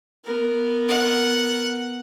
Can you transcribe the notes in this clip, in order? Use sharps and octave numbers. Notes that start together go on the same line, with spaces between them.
B3 A#4
F#5